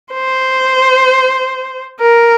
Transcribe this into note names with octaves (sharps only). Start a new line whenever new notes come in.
C5
A#4